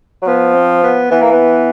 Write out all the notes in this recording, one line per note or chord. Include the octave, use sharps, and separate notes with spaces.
F#3
F3 B3
C4
B3
E3 B3
A#3
B3